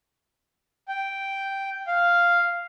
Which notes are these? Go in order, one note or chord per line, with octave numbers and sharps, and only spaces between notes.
G5
F5